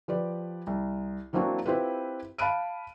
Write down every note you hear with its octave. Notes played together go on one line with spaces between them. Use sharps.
F3 G4 B4 D5
C2
E3 F#3 A#3 C4 D4 F#4
C4 E4 F4 G4 B4
F5 A5 B5 F#6 D7 D#7